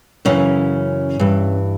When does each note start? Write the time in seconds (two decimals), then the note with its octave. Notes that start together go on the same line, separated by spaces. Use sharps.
0.25 F#2 C#3 E3 C#4
1.19 G2 E3